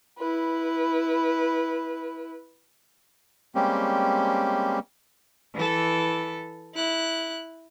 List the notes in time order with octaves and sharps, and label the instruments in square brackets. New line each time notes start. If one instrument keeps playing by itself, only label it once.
[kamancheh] E4 B4
[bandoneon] G3 G#3 A#3 C4 C#4 G4
[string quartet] E3 A4
E4 F#6